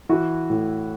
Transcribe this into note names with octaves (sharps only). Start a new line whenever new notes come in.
E3 E4 F#4
A2